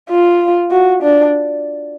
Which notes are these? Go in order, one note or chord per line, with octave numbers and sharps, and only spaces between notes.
F4
F#4
D4